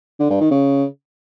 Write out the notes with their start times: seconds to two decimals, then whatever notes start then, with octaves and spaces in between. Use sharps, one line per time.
0.20 D3
0.30 G2
0.40 D#3
0.51 C#3